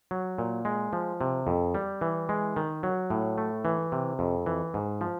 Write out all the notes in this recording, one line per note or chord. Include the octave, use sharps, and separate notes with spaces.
F#3
A#2
G#3
F3
C3
F2
G3
E3
G#3
D#3
F#3
A2
A3
E3
C3
F2
E3
G#2
F3